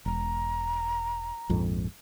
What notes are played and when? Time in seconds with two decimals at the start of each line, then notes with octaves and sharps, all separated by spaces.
0.06 E1 A#5
1.49 A#1 F2 G#2